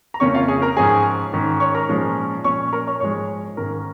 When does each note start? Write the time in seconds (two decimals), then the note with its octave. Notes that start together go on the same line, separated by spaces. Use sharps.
0.14 A#5
0.20 F2 C#3 A#3 C#4 C#5 C#6
0.34 F4 F5
0.48 G#4 G#5
0.62 A#4 A#5
0.77 G#2 F3 C#4 G#4 G#5
1.33 G#2 D#3 C#4
1.60 C#5 C#6
1.75 A#4 A#5
1.89 A#2 F3 G#3 C#4
2.44 A#2 F3 C#4 C#5 C#6
2.73 A#4 A#5
2.87 C#5 C#6
3.00 G#2 F3 G#3 C#5 C#6
3.57 G#2 D#3 C#4 A#4 A#5